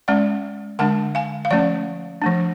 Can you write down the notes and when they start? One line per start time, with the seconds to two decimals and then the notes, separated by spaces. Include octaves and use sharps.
0.08 G#3 C#4 D5 F#5
0.79 D3 G#3 D4 F#5 A5
1.15 F5 G#5
1.45 F5
1.51 F3 A3 C#4 D5 F#5
2.22 F3 A3 D4